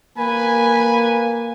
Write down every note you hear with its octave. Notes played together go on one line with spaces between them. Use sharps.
A#3 B4 G#5